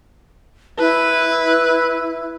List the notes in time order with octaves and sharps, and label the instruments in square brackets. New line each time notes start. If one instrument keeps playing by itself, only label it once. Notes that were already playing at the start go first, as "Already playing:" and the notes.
[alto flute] E4 [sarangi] B4